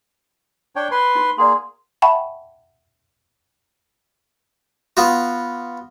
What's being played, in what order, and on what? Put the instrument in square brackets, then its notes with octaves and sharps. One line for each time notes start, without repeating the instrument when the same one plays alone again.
[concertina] D4 C#5 G5
B4 C6
[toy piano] D#4 F#4
[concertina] A#3 G#4 [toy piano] D5 F#5 C6
[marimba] E5 F#5 G5 A5 B5 C#6
[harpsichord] B3 F4 F#4